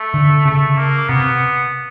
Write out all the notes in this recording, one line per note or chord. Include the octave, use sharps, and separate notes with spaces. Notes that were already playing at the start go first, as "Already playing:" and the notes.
Already playing: A3
D3
C#3 A3
A#3
C3 B3